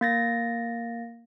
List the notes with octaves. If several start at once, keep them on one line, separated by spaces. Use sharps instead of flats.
A#3 A6 A#6